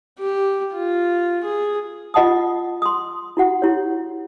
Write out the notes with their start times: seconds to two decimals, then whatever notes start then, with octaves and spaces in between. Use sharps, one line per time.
0.19 G4
0.74 F4
1.44 G#4
2.14 F4 D#5 F#5 A5 D#6
2.82 C6 D#6
3.37 E4 F#4 F#5
3.62 E4 G4 C#5